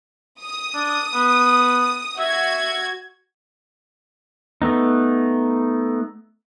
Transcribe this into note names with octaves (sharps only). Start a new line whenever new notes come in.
D#6
D4
B3
F#4 E5 G#6
A3 B3 D#4